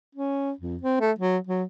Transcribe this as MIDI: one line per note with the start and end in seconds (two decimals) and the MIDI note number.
0.15 0.51 61
0.61 0.77 41
0.82 0.96 60
1.00 1.12 57
1.19 1.38 54
1.47 1.63 54